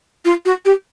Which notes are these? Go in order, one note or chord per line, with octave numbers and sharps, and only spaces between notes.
F4
F#4
G4